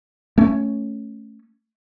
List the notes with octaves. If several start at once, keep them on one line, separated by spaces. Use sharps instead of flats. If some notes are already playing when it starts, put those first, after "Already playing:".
A3 C#4